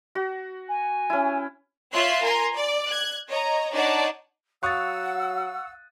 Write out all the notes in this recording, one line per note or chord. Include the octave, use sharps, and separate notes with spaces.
F#4
G#5
C#4 E4
F4 C#5 E5 C6 F#6 C7
A#4 G#5 A#5 C6
D5
F#6 G#6
C#5 D#5 A#5
D4 D#4 C#5 D5 F#5 A5
F#3 F5 F#5 C#6 D#6 E6 F#6 A6